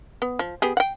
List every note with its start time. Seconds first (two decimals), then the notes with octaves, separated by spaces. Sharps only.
0.22 B3
0.39 F3
0.62 B3 G4 G#4
0.77 F#5 G5